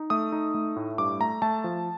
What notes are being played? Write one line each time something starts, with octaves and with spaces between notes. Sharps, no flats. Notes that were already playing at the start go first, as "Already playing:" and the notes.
Already playing: D#4
A3 D#6
D#4
A3
A2
G2 D6
A3 A#5
A3 A5
F3